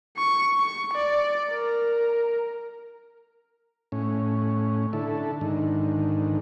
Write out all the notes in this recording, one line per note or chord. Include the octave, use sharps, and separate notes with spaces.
C#6
C#6
D5
A#4
A2 C#4
D3 E4 A4
G#2 D3 D#3